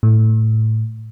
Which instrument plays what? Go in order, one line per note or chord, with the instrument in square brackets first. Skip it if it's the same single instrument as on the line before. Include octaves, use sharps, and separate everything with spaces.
[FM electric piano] A2